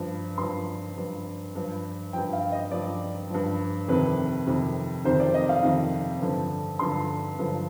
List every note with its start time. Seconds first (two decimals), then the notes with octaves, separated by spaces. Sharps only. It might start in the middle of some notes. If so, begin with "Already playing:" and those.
Already playing: G2 F3
0.38 G2 F3 C6
0.96 G2 F3
1.55 G2 F3
2.13 G2 F3 G5
2.33 F5
2.52 D#5
2.71 G2 F3 D5
3.30 G2 F3
3.88 F2 C3 D#3 B4
4.47 F2 C3 D#3
5.05 F2 C3 D#3 C5
5.20 D5
5.34 D#5
5.49 F5
5.63 F2 C3 D#3
6.21 G2 D3 F3
6.79 G2 D3 F3 C6
7.39 G2 D3 F3